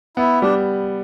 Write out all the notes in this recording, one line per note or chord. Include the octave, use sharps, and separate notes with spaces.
B3 E4
G3 D4